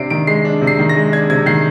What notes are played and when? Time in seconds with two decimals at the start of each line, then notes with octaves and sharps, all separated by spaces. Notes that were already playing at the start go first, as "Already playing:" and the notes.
Already playing: C3 D4 C7 D7
0.10 D#3 D7
0.27 G#3 C7
0.45 D4
0.61 C3
0.67 C7
0.79 D#3
0.89 A#6
0.96 G#3
1.12 D4 G#6
1.30 C3 G#6
1.46 D#3 C7